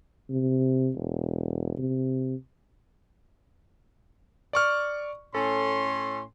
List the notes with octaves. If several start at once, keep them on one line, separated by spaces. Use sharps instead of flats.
C3
E1
C3
D5 C#6 F6
A2 C#4 A4 C6